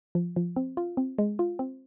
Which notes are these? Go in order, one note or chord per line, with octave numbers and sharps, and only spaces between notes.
F3
F3
C4
F4
C4
G#3
F4
C4